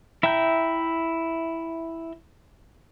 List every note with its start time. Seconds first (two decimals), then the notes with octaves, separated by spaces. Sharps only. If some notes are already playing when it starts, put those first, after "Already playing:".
0.23 E4 E5 G5 A#5 G6